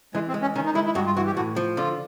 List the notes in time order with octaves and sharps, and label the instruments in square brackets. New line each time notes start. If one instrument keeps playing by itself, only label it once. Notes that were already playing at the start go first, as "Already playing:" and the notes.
[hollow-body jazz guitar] E3 [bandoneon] G#3
[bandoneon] C4
[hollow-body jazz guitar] G#3
[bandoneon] C#4
[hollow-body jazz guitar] D#3 [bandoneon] C#4
[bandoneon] D#4
[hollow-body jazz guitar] G#3 [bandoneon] E4
[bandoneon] E4
[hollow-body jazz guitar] G2 [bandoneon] F#4
[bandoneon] F4
[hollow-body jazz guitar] E3 [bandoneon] F#4
[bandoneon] G4
[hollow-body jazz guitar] A2 [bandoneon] F#4
[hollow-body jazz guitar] F3
[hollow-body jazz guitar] D3 [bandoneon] F4